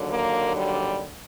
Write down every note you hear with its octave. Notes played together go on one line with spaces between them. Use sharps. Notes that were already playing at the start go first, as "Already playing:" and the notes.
Already playing: D#2 D3 F#3
A#3
G3